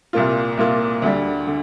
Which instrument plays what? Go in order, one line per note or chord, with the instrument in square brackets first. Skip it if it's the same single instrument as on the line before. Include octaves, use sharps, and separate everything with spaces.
[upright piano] C2 A#2 A#3 F4
C2 A#2 A#3 F4
D2 D3 G3
D3